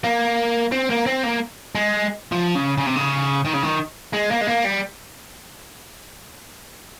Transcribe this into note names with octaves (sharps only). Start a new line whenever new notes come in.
A#3
C4
A#3
C4
A#3
G#3
F3
C#3
C#3
C3
C#3
D#3
C#3
D#3
G#3
A#3
G#3
A#3
G3